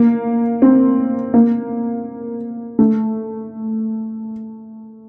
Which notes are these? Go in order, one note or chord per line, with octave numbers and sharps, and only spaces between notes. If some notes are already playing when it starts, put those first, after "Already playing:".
Already playing: A#3
C4
A#3
A3